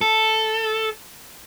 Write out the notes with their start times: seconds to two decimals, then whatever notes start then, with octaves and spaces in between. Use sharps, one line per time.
0.01 A4